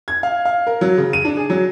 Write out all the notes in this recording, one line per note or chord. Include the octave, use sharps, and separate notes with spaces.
G#6
F5
F5
A#4
F#3
C#3
D#7
D4
G#4
F#3